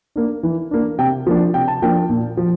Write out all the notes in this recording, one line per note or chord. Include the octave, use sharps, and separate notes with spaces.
A#3 D4
E3
A#3 D4
C3 G5
F3 A#3 D4
C3 G5
A5
F3 A#3 D4 G5
A#2
F3